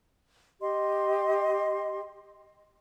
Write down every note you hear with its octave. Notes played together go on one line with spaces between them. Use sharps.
G4 D#5 C6